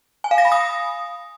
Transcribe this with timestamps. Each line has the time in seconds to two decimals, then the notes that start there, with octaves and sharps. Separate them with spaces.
0.24 G#5
0.31 F5
0.38 A#6
0.45 B5
0.52 D#6